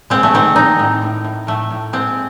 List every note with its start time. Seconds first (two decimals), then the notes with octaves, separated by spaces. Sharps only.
0.10 G#3 C4
0.23 A3
0.34 D#3 C4
0.56 G#3 D#4
0.79 A2
1.02 A2
1.24 A2
1.47 A2 A3
1.70 A2
1.93 G#3 C4